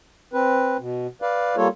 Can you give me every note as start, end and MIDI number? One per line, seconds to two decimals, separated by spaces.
0.33 0.77 60
0.33 0.77 71
0.80 1.07 47
1.22 1.56 71
1.22 1.56 74
1.22 1.56 77
1.57 1.68 55
1.57 1.68 58
1.57 1.68 65
1.57 1.68 69
1.57 1.68 73